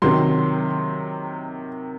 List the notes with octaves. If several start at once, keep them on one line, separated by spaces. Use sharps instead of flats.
C3 D#3 F#3 C6